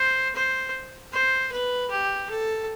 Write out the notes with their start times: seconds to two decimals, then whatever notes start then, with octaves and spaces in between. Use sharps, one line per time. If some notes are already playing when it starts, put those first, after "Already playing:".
Already playing: C5
0.35 C5
1.13 C5
1.52 B4
1.90 G4
2.29 A4